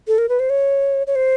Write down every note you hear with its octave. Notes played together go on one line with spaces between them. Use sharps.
A4
A#4
B4
C5
C#5
C#5
C5